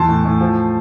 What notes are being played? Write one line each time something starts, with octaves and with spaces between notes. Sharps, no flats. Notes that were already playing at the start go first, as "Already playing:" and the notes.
Already playing: E2 E3 A5 C6
A2
A2
F3